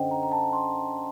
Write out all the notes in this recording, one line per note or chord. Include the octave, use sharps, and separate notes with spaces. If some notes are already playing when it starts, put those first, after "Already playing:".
Already playing: F#2 D3 C5 D#5 F#5 G5
A#5
A#5
A5
C6